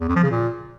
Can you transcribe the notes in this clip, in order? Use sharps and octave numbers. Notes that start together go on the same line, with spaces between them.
E2
F2
F3
C#3
A#2